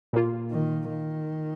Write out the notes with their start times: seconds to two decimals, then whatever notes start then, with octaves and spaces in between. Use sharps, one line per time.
0.13 A#2 A#3 F4
0.51 D#3
0.89 D#3